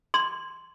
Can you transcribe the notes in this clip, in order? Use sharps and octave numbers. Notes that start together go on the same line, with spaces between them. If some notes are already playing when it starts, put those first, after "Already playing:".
C6